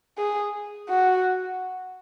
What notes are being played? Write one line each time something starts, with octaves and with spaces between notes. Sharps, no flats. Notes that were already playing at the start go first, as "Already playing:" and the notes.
G#4
F#4